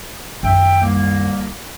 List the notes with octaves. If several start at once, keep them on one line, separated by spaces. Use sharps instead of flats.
F#2 D#3 E5 G5
C2 A#3